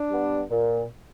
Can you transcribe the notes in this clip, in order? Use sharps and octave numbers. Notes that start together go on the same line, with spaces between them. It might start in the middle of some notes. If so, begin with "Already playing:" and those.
Already playing: D4
G3 B3
A#2